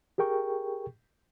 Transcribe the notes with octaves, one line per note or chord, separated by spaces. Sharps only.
G4 G#4 A#4 G5 C#6